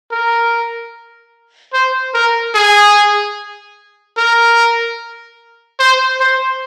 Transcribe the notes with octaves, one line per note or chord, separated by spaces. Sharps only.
A#4
C5
A#4
G#4
A#4
C5
C5